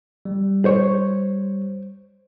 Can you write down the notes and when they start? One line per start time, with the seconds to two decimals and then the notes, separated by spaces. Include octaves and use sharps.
0.25 G3
0.65 C5 C#5